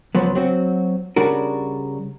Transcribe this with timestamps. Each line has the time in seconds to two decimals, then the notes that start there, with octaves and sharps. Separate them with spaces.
0.15 C#2 F3 F#3 B3
0.35 F#3 C4 F#4
1.16 C#3 G3 D4 F#4 A#4